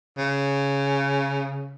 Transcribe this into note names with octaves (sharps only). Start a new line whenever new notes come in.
C#3